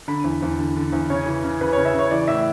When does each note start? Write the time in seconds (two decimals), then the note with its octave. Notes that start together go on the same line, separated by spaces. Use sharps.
0.08 D3 B5
0.24 E2
0.42 E2
0.59 D3
0.76 D3
0.93 E2
1.10 C#3 C#5
1.26 E3
1.44 C#3
1.61 C#3 B4
1.73 C#5
1.77 C#3
1.85 E5
1.94 C#3 C#5
2.11 E3 D5
2.28 A2 E5